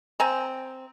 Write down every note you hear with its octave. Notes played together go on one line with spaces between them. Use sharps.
C4 G#5 A#5